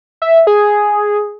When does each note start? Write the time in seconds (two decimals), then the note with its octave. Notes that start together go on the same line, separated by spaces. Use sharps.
0.22 E5
0.47 G#4